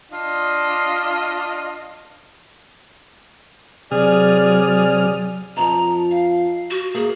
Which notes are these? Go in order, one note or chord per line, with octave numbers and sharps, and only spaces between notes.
D4 F4 D#5
C3 F#3 G#4 D5 D#6 F6
F2 F3 A#5
F5
F#4
A#3 G#4